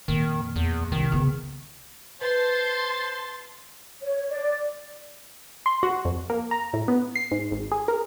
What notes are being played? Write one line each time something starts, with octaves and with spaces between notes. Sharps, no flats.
F2 A#2 D#3
E2
C2 D#3
C#3 B3
B4 C5 A5 C6 A6
C#5
D5
C6
F#4
F2
A#3
A#5
A2
B3
C7
G#2
G#1
G#4
A#4